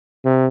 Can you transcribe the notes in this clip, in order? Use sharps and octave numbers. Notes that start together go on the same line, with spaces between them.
C3